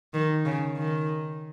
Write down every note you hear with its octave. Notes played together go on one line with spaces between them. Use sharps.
D#3
C#3
D#3